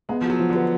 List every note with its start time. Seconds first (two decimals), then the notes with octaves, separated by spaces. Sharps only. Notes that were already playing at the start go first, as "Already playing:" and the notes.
0.09 G#3 B3
0.21 F3 F#4
0.30 F#3
0.39 F3
0.50 D3
0.55 B4